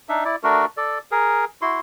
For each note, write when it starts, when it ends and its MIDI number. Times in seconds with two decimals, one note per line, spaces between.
0.09 0.24 62
0.09 0.24 63
0.09 0.24 76
0.25 0.36 64
0.25 0.36 74
0.43 0.65 57
0.43 0.65 62
0.43 0.65 66
0.43 0.65 70
0.77 0.99 69
0.77 0.99 74
1.11 1.45 68
1.11 1.45 70
1.62 1.80 64
1.62 1.80 66
1.62 1.80 84